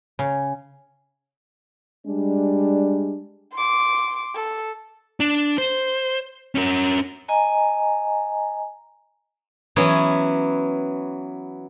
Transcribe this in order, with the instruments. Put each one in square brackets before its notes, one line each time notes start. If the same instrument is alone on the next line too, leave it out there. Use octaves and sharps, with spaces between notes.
[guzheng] C#3
[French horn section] G3 G#3 D4
[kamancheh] C6 D6
A4
[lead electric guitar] D4
C5
C#4 A#4
[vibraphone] D#5 G#5 A#5
[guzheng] E3 F#3 B3 C#4